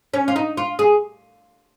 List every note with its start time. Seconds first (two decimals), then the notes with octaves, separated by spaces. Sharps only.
0.14 C#4
0.28 F4
0.36 D#4
0.57 F4
0.79 G#4